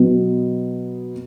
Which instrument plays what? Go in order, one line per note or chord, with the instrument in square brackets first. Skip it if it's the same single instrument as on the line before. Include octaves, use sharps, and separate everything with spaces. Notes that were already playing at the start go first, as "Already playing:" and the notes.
Already playing: [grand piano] B2 F#3 B3